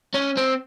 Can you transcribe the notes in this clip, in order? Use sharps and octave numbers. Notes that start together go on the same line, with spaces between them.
C#4
C4